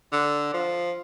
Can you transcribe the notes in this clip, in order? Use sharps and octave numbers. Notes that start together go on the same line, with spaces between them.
D3
F3